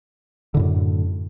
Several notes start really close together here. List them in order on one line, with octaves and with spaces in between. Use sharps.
D3 A2 F#2